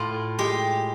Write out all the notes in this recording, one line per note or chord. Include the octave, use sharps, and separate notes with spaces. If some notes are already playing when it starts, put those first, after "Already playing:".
Already playing: A2 F4
G#3 G4